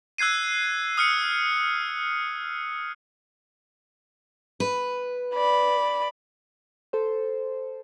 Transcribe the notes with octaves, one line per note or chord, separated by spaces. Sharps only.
E6 F#6 G#6 C7 D#7
D#6 F6 C#7
B4
D5 B5
A4 C5